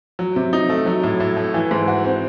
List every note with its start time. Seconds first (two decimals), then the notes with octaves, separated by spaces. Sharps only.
0.19 F#3
0.36 C3
0.53 D#4
0.69 A3
0.86 F#3
1.03 A2
1.20 A2
1.36 A3
1.54 E3
1.71 G#2
1.88 F#4
2.04 C4